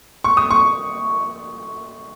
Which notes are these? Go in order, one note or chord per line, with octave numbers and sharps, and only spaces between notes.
C#6
D#6
C#6